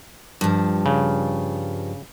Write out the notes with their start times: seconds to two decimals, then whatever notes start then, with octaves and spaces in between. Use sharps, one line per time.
0.41 G2 F3
0.86 C#3